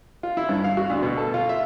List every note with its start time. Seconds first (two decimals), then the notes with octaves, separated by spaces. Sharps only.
0.23 F4
0.37 E4
0.49 G2
0.64 F5
0.77 F#4
0.90 D2
1.03 B2
1.17 A4
1.34 F4
1.49 E5